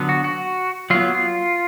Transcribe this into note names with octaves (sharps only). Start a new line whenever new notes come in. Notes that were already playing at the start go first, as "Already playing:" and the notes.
Already playing: D3 F#3 B3
F#4
F#4
F#3 B3 F4
F4